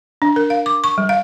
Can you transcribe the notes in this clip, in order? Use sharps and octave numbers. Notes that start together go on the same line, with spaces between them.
D4
A#4
F5
D6
C#6
G3
F5